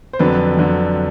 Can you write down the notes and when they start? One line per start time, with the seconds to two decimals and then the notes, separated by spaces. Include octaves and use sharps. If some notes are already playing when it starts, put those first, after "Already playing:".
0.13 C5
0.19 F2 D3 F#3 B4
0.57 F2 D3 F#3